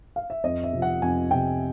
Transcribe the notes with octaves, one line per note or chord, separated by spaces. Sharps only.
F5
E5
F2 D#5
E5
C3 F3
F#5
F2 G#5
C3 F3 G5